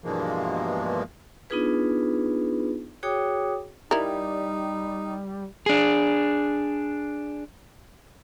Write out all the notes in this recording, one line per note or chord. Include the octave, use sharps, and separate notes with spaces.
G2 B2 E3 F3 G#3 A#3
B3 D4 D#4 F4 G#4 B4
F#4 G#4 C#5 G5 D6 D#6
G3 D#4 E4 A#4
D4 G#4